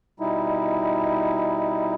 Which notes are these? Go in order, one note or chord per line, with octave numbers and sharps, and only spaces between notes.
B2 G3 D#4 E4